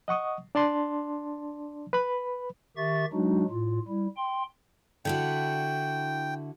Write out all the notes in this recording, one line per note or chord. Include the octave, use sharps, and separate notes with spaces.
D#5 F#5 C#6 D#6
D4 D5 A5 C6
B4 B5
D#3 G4 E5 C#6 A6
F#3 G#3 D4 D#4 F#4
A2 F4
G3 E4
G5 C6
D3 E4 F#4 G5